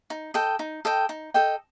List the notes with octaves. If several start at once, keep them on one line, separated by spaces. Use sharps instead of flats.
D#4
A4 D#5 G5
D#4
A4 D#5 G5
D#4
A4 D#5 G5